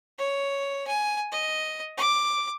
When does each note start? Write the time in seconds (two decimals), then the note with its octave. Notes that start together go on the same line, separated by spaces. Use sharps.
0.18 C#5
0.87 G#5
1.32 D#5
1.97 D6